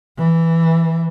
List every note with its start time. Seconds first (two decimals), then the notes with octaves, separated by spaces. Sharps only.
0.18 E3